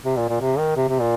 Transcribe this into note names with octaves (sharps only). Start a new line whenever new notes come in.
C3
A#2
A#2
C3
D#3
C3
C3
A#2